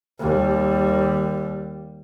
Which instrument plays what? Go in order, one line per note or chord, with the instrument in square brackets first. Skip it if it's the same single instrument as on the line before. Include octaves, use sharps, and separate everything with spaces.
[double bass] D#2 G3